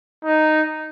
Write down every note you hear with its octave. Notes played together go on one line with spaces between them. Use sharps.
D#4